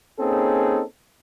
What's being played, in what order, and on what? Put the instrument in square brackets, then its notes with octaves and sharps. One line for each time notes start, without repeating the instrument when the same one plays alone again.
[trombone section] A#3 C4 C#4 D#4 G#4 A4